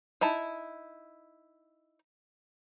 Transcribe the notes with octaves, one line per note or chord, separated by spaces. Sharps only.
D#4 E4 A5